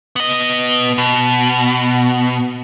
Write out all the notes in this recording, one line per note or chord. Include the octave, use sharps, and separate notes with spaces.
B3 D#5
B2